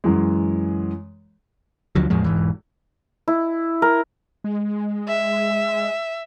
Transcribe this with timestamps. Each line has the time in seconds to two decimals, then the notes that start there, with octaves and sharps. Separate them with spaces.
0.04 F#2 E3 G#3
1.95 D2 D3 F3 F#3
2.10 E2 A2 F3 G#3
2.24 E1 G#2 E3
3.28 E4
3.82 A#4
4.44 G#3
5.08 E5